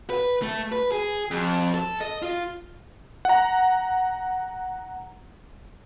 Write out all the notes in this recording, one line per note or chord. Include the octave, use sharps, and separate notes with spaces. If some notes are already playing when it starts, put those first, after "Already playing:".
B4
A3
B4
G#4
F2
A4
D#5
F4
F#5 A#5